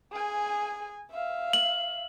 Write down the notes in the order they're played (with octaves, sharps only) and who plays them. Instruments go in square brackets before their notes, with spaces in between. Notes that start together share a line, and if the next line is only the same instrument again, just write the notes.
[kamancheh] G#4 G#5
E5 F5
[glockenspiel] F#7